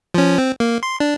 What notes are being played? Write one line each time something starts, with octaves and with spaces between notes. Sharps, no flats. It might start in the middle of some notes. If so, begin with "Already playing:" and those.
F3 C#4
C4
A#3
C6
D4